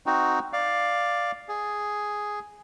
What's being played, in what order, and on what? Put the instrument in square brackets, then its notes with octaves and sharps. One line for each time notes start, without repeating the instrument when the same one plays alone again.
[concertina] C4 D#4 F#4
D5 F5
G#4